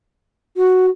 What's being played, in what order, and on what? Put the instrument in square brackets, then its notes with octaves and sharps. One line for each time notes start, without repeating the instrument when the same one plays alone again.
[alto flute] F#4